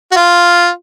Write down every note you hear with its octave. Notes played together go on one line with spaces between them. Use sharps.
F#4
F4